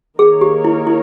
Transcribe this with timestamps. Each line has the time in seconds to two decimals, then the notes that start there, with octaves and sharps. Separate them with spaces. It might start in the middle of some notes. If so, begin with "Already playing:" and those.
0.19 D#3 A#3 D#4 G#4 A#4 C#5
0.41 G4
0.64 E4
0.87 E4